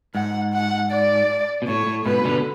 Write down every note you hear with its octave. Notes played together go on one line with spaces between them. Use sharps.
G#2 F#5
F#5
D5
B2
A2 C#5
A2
G#2 B2 B4
B2 D3